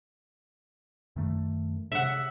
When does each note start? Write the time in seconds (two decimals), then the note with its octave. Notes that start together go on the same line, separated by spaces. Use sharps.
1.16 F#2 D#3 A3
1.92 C3 E5 F#5